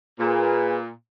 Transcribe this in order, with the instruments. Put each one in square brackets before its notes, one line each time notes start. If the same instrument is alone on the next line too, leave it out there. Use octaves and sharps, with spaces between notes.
[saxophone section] A#2 [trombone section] G#4 B4